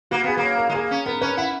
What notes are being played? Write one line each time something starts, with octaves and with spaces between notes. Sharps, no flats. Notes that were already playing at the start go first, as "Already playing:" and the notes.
A#3 F#4
B3 G#4
A#3
C#5
A#4
G#3
A#3 G#4
C#4
B3 A#4
C#4 B4
E4 F#5